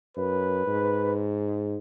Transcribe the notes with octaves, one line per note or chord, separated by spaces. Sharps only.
F#2 B4
G#2